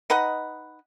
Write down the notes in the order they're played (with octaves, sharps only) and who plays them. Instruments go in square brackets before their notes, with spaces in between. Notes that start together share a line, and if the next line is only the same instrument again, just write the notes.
[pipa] D#4 B4 D#5 F#5